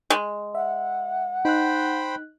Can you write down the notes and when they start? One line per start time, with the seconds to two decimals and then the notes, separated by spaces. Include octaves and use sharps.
0.10 G#3
0.55 E5 F#5
1.45 D#4 C5 G5 B5 F#6